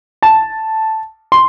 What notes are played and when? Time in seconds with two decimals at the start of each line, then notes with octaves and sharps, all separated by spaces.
0.22 A5
1.32 C6